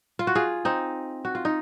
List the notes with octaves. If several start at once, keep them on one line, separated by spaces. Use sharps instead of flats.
F4
F#4
F4 G#4
C4 D#4
F#4
F4
D#4